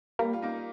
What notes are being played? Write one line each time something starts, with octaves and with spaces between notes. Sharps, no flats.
G3 A#3
F4
A#3 D#4